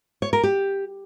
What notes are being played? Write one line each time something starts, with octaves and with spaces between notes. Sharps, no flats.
C#5
A#4
G4